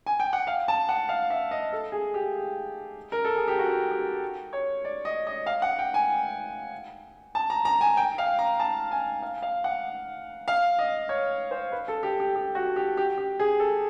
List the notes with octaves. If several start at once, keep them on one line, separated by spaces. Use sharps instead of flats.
G#5
G5
F#5
F5
A5
F#5
F5
E5
D#5
A4
G#4
G4
A#4
A4
G#4
G4
F#4
G4
C#5
D5
D#5
D#5
F5
F#5
G5
G#5
A5
A#5
A#5
G#5
G5
F5
A#5
A5
G#5
F5
F5
F#5
F5
D#5
C#5
C5
B4
A4
G4
G4
G4
F#4
G4
G4
G4
G#4
A4